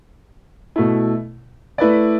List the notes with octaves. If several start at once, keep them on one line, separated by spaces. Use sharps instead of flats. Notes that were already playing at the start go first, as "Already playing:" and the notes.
B2 A3 E4
A3 E4 B4 D5